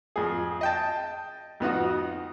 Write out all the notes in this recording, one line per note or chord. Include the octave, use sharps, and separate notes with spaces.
F2 G#4
D#5 G5 A5
F2 B3 D#4 F#4